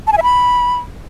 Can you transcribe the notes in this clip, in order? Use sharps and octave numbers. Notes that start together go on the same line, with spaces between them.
A5
G#5
E5
B5